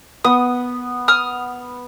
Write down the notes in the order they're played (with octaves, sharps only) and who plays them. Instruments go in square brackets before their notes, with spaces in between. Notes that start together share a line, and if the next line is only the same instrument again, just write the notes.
[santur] B3 [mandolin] D#6
[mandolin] D#6 F6